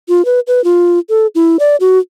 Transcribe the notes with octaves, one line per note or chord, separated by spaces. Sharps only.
F4
B4
B4
F4
A4
E4
D5
F#4